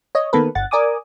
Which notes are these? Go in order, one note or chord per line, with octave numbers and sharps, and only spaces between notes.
C#5 D#5
D#3 A#3 B3 A4 B4
G1 F#5 A6
A#4 D5 G#5 D6 D#6